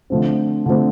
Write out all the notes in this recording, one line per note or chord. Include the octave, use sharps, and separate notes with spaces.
D3 F3 A3 C4
D3 F3 A3 C4